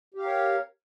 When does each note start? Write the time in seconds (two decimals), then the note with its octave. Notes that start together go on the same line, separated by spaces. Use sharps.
0.14 G4
0.18 F5
0.23 A#4
0.27 C#5